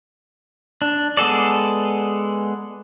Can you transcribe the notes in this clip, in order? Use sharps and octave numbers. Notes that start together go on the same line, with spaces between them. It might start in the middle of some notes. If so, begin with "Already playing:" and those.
D4
G#3 B3 G#4 A4 D5